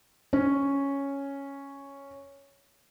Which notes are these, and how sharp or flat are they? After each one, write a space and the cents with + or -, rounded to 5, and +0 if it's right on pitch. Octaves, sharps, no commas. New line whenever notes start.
C#4 +0 C#5 +0